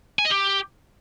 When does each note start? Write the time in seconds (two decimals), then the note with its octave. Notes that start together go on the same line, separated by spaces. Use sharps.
0.19 G#5
0.25 D#5
0.31 G4